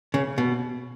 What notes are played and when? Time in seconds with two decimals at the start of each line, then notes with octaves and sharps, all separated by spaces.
0.14 C#3
0.38 B2